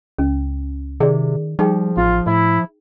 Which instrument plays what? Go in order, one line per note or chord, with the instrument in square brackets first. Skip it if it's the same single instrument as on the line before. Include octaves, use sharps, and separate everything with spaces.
[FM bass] C#2 [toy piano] C#4
[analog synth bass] C3 [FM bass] D#3 [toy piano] G#4 D5
[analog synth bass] F3 [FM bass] G3 [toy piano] D#4 G#4 G5
[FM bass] A1 [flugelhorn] F4
[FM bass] A2 [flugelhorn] E4